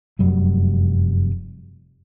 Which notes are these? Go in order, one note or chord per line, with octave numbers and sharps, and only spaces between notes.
F1 F#2 F#3 G3